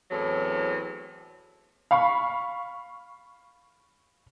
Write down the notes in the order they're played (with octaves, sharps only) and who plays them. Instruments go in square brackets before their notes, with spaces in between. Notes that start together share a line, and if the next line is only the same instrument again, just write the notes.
[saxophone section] E2 A2 F#3 C4
[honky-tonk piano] F5 B5 C#6